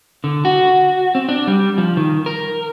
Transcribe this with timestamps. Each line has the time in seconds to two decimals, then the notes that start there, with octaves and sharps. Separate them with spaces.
0.24 D3
0.45 F#4
1.15 C4
1.29 D4
1.47 G3
1.78 F3
1.97 D#3
2.26 A#4